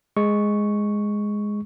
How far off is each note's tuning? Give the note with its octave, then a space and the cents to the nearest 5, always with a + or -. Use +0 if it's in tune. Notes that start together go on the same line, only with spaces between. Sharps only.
G#3 +0 C#6 +0